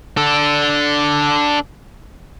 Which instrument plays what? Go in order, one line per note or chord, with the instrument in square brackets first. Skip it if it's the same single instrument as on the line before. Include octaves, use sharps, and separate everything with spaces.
[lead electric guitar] D4 A4